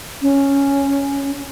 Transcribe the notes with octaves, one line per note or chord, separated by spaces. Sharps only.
C#4